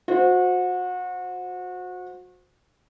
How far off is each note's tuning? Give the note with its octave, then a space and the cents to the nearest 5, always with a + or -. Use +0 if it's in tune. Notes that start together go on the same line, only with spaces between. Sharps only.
F#4 -30 C5 +0